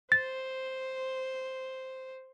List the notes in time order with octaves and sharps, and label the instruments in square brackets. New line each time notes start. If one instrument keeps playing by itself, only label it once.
[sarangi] C5 [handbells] A6